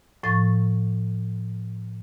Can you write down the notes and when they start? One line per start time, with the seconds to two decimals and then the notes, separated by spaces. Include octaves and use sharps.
0.23 A2 F3 C#6 A6